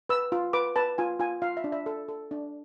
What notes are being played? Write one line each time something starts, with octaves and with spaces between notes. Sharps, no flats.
B4 E6
F4
B4 D6
B4 A5
F4 G#5
F4 G#5
F4 F5
E5
D4
E5
A4
A4
D4